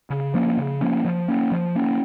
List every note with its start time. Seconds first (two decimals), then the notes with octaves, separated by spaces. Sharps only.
0.10 C#3
0.34 F3 A#3 C#4
0.58 C#3
0.81 F3 A#3 C#4
1.05 F3
1.28 A#3 C#4
1.52 F3
1.75 A#3 C#4